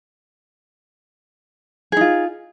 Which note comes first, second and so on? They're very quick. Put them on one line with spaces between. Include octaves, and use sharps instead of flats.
G#4 D#4 F4